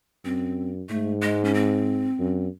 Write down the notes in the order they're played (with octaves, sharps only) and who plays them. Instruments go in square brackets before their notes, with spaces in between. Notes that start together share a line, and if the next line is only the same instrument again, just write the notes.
[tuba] F#2 [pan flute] C4
[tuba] G#2 [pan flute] A3
[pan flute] G#3
C#4
C4
[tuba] F#2